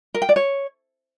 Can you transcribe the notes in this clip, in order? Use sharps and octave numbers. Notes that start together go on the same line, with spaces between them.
A#4
G5
D5
C#5